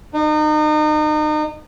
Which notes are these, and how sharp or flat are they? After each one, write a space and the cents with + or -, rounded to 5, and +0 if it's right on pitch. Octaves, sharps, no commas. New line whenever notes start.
D#4 -35